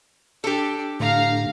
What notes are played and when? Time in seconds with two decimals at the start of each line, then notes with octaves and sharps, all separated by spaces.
0.44 D4 G4 A4
1.00 A2 D3 F5 A#5